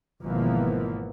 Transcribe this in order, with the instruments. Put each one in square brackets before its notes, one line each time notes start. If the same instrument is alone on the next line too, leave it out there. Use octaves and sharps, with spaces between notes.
[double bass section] G#1 B2 E3 F3 A#3 B3